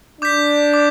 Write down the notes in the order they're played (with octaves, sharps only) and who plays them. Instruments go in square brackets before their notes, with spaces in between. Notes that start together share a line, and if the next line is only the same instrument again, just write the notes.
[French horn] D4 [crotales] D6 G6 B6
[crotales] D6